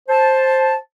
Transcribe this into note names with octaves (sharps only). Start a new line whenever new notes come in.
C5 A5